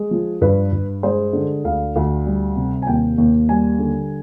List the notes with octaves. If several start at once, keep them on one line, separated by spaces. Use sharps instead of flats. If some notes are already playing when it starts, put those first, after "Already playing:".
Already playing: G#3
F3
G2 B4
G2
G#3 C5
D3
D2 F5
D2
G3
C3
G#5
D#2 G5
D#2
G3 G#5
D3